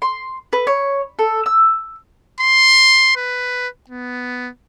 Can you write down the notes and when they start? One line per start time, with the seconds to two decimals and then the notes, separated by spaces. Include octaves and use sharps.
0.02 C6
0.53 B4
0.67 C#5
1.19 A4
1.46 E6
2.40 C6
3.17 B4
3.89 B3